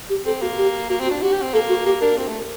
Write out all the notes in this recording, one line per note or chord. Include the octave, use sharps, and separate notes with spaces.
G4
C4 A4
A#3 F#4
G4
A#3 F#4
C4
F#4
D4
F#4 G4
G4
C4
A#3 A4
F#4
A#3 G4
D4 A#4
C4
A3